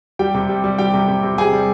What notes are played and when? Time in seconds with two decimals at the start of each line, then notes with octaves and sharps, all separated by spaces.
0.19 G3 G4 G5
0.34 C3
0.49 G3
0.64 G3
0.78 G3 G4 G5
0.94 C3
1.08 C3
1.23 C3
1.38 C3 G#4 G#5
1.53 G3